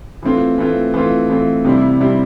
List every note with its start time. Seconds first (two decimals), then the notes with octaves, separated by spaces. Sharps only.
0.22 E3 A3 C4 F4
0.58 E3 A3 C4 F4
0.94 E3 A3 C4 F4
1.29 E3 A3 C4 F4
1.65 C3 G3 C4 E4
2.00 C3 G3 C4 E4